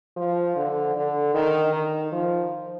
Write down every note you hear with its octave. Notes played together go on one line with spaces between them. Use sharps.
F3
D3
D3
D#3
D#3
F3